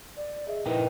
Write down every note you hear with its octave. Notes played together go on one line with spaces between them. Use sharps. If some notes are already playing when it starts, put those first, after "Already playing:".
D5
G#4 D#5 E5
A#2 D#4 E4 A#4 B4 D#5 G5